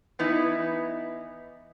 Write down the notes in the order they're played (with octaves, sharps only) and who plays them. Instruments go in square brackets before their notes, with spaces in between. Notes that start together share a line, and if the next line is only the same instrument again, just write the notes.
[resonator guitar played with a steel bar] E3 B3 D#4 E4